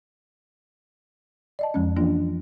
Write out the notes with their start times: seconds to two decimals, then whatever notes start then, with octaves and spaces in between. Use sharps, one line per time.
1.59 D5 D#5 A5
1.74 F2 F3 G#3 C#4
1.97 E3 F3 A#3 D4 F4